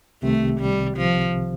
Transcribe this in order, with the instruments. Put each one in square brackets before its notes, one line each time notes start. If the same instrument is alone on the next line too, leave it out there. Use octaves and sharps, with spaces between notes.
[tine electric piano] C2 C3 D#3 [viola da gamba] A3
[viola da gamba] G3
F3